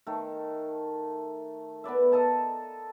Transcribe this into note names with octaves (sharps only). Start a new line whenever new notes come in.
D#3 A3
B3 B4 D5 E5
A4 D#5 A5 A#5